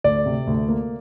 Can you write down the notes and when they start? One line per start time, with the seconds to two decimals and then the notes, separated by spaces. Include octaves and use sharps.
0.04 D2 D5
0.26 C3
0.47 D2
0.69 A#3